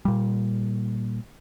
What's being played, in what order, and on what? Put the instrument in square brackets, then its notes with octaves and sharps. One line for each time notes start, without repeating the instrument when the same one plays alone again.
[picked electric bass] A#2 G3